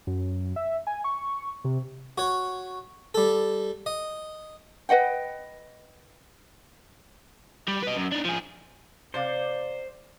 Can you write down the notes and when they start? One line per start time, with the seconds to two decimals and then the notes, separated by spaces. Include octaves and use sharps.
0.07 F#2
0.56 E5
0.87 G#5
1.04 C#6
1.64 C3
2.18 F#4 C#5
3.14 G3 A4
3.86 D#5
4.89 B4 D#5 F#5 G5
7.68 G3
7.82 B4 D#5
7.95 F#2
8.12 D4 D#4
8.25 F3 G#4
9.14 C3 C5 D5 F5